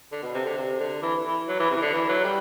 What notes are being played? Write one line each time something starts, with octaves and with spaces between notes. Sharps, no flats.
D3
B2
C3
D3
C3
D3
E3
E3
F#3
E3
C3
E3
D3
E3
F#3
G3